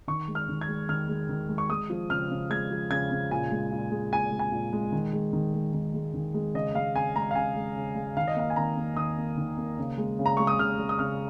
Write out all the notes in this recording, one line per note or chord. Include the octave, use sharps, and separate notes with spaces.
D#3 C#6
G#3
F6
D#3
G#6
G#3
D#3 F6
G#3
D#3
G#3
C#6
G#3 D#6
F3
C#3 F6
C#3
G#3 G#6
F3
C#3 G#6
C#3
A#2 G#5
G#3
A#2
G#3
A#2 G#5
G#3
G#5
A#2
G#3
D#3
G#3
D#3
G#3
D#3
G#3
D#3
G#3
C#3 D#5
G#3 F5
C#3 G#5
G#3 A#5
F5
C#3 G#5
G#3
C#3
G#3
D#3 F5
D#5
A#3 F5
G#5
D#3 A#5
A#3
D#3 D#6
A#3
D#3
A#3
C#3
G#3
C#3
A#5
G#3 C#6
D#6
C#3 F6
G#3
D#6
C#3 F6